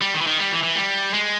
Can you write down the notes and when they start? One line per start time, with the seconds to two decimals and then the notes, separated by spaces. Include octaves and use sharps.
0.01 G3
0.14 D#3
0.21 E3
0.27 D#3
0.39 G3
0.52 E3
0.63 E3
0.76 G3
1.13 G#3